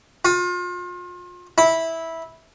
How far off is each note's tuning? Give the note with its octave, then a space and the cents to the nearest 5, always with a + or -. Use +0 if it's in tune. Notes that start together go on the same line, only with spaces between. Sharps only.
F4 +35
E4 -10